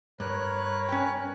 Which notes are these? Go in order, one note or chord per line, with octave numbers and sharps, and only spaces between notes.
G2 A#4 B4 C#5 F#6
C#4 G5